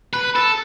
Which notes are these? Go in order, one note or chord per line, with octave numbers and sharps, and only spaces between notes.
B4
A4